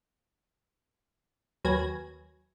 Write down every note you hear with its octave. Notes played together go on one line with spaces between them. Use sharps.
D#2 F#3 B4 G#5 G#6 A#6